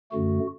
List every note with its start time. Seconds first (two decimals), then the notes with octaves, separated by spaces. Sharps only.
0.12 F#2 D3 A3 F#4